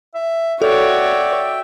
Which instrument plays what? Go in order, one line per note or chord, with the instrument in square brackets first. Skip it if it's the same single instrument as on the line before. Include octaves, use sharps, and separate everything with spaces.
[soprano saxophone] E5
[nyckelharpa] F#4 C#5 [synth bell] A4 [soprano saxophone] D5 [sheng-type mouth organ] E5 G5